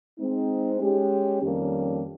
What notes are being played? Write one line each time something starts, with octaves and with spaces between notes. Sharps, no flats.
G#3 C4 D#4
G#3 C#4 G4
F2 D#3 G3 A#3 C#4